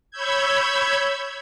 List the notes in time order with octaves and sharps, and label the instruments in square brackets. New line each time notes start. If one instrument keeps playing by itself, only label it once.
[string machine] C#5 B5 E6 G6 G#6